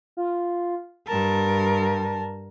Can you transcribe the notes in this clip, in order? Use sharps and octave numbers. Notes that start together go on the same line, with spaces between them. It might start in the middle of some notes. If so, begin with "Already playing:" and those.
F4
G2 A#4 A5